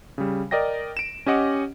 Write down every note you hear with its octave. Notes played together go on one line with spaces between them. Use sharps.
C#3 G3
A#4 D5 D#5 G5 A#6
D7 E7
C#4 G4 D#5 F#5 D6